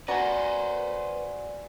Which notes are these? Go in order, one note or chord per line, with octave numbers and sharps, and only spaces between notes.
F#4 B4 C5 D5 G#5 A#5